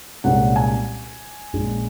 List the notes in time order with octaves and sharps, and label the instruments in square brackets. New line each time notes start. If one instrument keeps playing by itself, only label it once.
[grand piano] C2 A#2 G#3 C#4 F#5
G#5
A#1 A#2 G#3 C#4